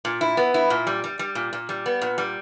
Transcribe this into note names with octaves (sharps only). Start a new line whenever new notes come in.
A#2
E4
B3
E4
A#2
G3
G3
G3
A#2
A#2
G3
B3
A#2
G3